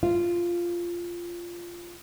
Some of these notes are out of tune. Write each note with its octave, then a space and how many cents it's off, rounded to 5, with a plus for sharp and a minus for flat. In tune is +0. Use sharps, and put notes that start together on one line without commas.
F4 -10